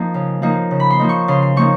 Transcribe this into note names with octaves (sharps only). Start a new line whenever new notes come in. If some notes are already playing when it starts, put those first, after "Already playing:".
Already playing: F3 A#3 D#4 A5
C#3
F3 A#3 D#4
C#3
B5
C6
F3 A#3 D#4
C#6
C#3 C6
C6
F3 A#3 D#4 C#6